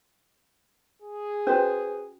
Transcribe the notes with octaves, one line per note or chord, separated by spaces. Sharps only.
G#4
C#4 F#4 B4 C5